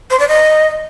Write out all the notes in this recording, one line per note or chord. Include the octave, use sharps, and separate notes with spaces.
C5
D5
D#5